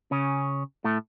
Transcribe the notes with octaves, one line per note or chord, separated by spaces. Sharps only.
C#3 C#4
A2 A3